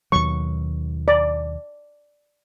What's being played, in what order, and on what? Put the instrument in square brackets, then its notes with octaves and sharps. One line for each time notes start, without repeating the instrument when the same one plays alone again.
[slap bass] D#2 B2 F#3 [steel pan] C#6
[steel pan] D5